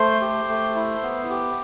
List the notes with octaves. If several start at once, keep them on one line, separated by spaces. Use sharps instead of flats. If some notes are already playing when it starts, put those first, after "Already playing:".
Already playing: A3 C5 C6
G4
A3
E4
B3
G4